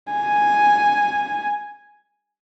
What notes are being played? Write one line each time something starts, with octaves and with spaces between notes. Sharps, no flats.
G#5